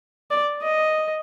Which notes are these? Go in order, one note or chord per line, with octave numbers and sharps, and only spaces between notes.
D5
D#5